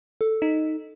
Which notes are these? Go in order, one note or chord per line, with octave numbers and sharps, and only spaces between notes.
A4
D#4